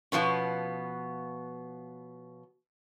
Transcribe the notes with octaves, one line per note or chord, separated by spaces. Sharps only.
B2 F3 B3 C#4